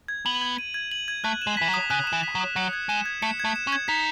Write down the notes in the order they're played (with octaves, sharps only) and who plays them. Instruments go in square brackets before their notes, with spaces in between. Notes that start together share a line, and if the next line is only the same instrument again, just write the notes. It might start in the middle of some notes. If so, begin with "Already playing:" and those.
[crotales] G#6
[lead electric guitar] B3 [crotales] F#7
[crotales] G#6
D#7
G#6
F#7
G#6
[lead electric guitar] A3 [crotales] F#6
[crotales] E7
[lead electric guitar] G#3
[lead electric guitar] E3 [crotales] B6
[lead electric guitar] F#3
[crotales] D#6
[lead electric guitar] C#3 [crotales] F#6
[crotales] E7
[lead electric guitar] E3
[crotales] B6
[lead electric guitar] F#3
[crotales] D#6
[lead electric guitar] F#3 [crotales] C#7
[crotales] G#6
[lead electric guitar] G#3 [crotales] E7
[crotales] G#6
[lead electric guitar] A3 [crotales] C#7
[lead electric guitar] A3 [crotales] G#6
[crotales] E7
[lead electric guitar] C#4
[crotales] G#6
[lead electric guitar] D#4 [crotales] B6